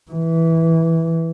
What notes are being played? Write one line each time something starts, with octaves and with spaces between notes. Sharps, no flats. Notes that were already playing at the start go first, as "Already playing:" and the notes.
E3